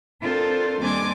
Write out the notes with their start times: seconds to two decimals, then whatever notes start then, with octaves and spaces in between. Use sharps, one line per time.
0.20 C4 D4 F4 A4 A#4 C5
0.80 D#2 G3 C4 D4 G#5 D6